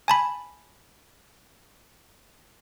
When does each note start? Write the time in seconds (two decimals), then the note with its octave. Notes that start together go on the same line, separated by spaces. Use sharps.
0.08 G#5 A5 B5